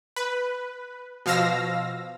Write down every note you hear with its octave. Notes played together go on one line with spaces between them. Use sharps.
B4
B2 F3 F5 E6 A#6